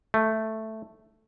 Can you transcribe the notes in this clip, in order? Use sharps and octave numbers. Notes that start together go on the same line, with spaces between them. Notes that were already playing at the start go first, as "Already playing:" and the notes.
A3